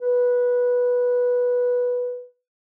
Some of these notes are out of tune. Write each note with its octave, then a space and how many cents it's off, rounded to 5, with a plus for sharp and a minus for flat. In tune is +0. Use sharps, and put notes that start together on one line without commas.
B4 -10